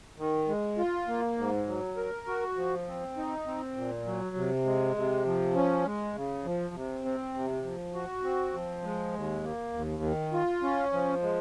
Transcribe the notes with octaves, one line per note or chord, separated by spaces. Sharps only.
D#3
G#3
F4
A#3
G#2
F#3
A#4
F#4
F3
C4
D#4
C4
A#2
F#3
C3
G#3
C3
F3
C#4
G#3
C#3
F3
C3
C4
C3
F3
F#4
C4
F3
G#3
D#2
A#3
D#2
D#3
F4
C#4
F3
G#3